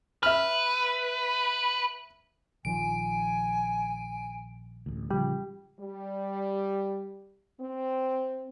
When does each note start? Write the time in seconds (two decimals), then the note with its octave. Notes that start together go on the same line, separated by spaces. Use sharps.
0.23 B4 E5 F6
2.65 A#1 D#3 F3 G#5 D7
4.86 A1 D2
5.11 A1 C#3 F3 G3
5.80 G3
7.60 C4